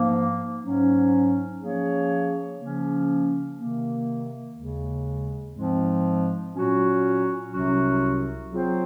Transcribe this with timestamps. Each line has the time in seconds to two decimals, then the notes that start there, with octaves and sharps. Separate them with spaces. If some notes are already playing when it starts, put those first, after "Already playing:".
Already playing: G#2 F3 A#3
0.61 G#2 F#3 C#4
1.60 F3 A#3 C#4 G#4 C#5
2.58 C#3 F3 A#3 C#4
3.56 C3 D#3 A#3
4.55 D#2 C#3 G#3
5.54 G#2 F3 G#3 C4
6.53 A#2 F#3 C#4 F#4
7.51 C2 C3 F#3 C#4 F#4
8.50 F#3 C4 F4 G#4 C5